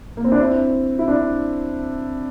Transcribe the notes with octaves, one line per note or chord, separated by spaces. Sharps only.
A#3
C4
D4
C4 E4
E4
D4